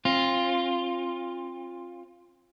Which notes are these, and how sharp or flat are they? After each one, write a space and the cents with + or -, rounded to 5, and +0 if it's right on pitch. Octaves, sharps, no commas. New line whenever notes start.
C4 +35 F4 +0